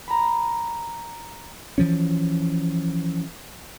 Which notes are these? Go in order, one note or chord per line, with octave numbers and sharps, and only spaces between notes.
A#5 B5
E3 F3 C#4